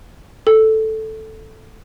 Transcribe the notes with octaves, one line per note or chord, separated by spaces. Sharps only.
A4